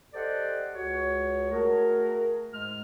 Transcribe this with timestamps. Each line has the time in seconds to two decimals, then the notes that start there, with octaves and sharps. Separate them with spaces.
0.13 G4 A4 C5 D5 D#5 F#5
0.74 C#2 F#4 G#4 C#5
1.51 A3 F#4 G#4 A#4
2.51 G#2 G#3 F6